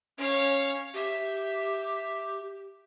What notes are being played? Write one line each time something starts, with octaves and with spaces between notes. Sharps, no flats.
C#4 C#5 F5
G4 E5